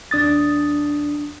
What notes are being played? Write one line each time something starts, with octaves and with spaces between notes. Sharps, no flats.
D#2 D4 D#6 A6